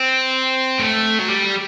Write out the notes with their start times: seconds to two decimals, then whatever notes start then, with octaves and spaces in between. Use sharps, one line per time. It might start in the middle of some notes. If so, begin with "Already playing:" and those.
Already playing: C4
0.79 A3
1.19 F#3
1.28 G3